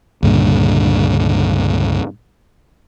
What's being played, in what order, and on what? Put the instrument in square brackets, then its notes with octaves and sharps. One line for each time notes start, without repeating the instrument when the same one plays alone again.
[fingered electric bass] C#2 G2 A#2 D3